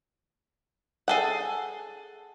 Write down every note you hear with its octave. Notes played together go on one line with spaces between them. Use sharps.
G#4 A4 F#5